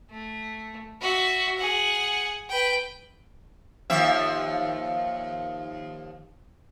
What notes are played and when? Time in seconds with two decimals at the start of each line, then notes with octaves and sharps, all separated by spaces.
0.11 A3
1.02 F#4 E5
1.58 G#4 F#5
2.49 B4 G5
3.90 D#2 F3 E5